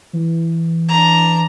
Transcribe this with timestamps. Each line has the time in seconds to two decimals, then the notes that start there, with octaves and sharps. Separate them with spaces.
0.13 E3
0.89 D4 A#5